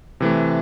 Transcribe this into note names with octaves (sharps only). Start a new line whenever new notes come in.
C3 E3 A3